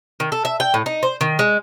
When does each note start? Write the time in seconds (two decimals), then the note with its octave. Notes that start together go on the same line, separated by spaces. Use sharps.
0.20 D#3
0.32 A4
0.45 E5
0.60 G5
0.74 A2
0.86 D#4
1.03 C5
1.21 D#3
1.39 G#3